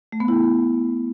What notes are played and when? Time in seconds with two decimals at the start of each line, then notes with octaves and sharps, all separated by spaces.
0.12 A3
0.20 B3
0.28 E4